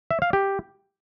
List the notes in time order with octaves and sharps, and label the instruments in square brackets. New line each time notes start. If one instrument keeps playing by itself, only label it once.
[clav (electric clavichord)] E5
F5
G4